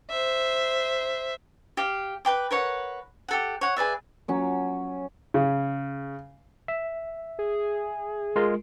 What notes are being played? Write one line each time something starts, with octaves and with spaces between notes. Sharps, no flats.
C5 E5
G4 F5
B4 G5 D6
A#4 B4 C#5 F#5
G4 A4 F#5
C#5 F#5
G#4 B4 D5 E5
F#3 C#4
C#3
E5
G#4
G#3 F4 A#4